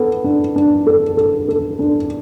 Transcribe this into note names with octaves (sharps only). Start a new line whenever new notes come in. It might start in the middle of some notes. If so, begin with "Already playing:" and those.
Already playing: B3 A4
D4
D4
A4
A4
A4
D4